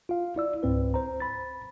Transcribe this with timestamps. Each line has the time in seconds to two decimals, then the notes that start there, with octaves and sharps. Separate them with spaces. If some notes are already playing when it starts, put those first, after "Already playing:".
0.09 F4 F5
0.36 E4 D5 E6
0.63 C#2 G#2 C4 B4
0.94 C5 A#5
1.20 B5 A6